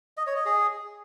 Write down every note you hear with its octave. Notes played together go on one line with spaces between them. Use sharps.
D#5
C#5
D#5
G#4